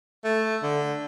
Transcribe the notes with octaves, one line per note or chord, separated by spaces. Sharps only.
A3
D3